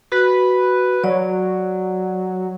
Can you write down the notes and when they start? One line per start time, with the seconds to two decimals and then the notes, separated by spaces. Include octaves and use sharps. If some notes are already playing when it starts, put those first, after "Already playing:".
0.12 F#4 B4
1.04 F#3 D5